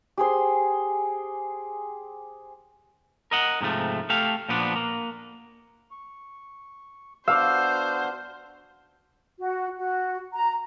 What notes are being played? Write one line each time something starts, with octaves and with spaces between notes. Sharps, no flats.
G4 G#4 C5
A#4 D#5 F#5
G#2 C3 F3 A3
A3 G4 A4 F5
A#2 F3 B3 D4
A#3
C#6
B3 D4 F#4 C5 F5 D6 E6
F#4
F#4
A#5